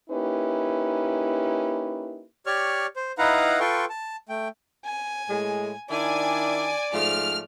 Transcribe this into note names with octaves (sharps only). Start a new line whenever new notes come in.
A#3 C#4 D#4 E4 G4 B4
G4 C#5 D5 C#6 F6
C5
D#4 E4 B4 F5 F#5 A#5
F4 A4 B4 G5 C6 C#6
A5
A3 G5
G#5
A2 G#3
D#3 D4 E4 D5 G#5
G#2 F3 A3 F6